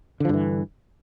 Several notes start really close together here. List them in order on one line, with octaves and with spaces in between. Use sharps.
D3 F3 G2 E3